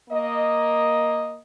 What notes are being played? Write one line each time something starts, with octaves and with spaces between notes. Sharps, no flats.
A#3 D#5